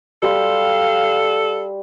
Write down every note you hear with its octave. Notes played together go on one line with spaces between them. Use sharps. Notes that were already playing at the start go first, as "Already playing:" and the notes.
G3 G4 A4 F5 C6